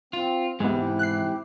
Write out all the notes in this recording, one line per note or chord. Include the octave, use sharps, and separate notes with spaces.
C4 F4
G#2 C3 E3 G#3 B3 E4 G4
F#6 C7